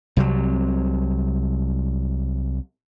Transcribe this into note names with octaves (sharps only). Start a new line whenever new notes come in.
C2 C3 F3 F#3